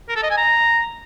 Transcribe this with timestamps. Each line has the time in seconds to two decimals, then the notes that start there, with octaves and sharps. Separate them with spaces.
0.09 A#4
0.16 A4
0.23 D#5
0.30 G#5
0.37 A#5